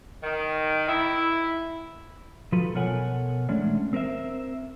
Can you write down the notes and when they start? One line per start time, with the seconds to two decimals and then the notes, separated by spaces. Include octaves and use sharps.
0.23 D#3
0.87 E4
2.52 F3 F#3 F4 A4 B4
2.74 B2 A4 A#4 C#5 F#5 G#5
3.49 E3 G#3 A3 C#4 D4
3.93 C4 A#4 C5 E5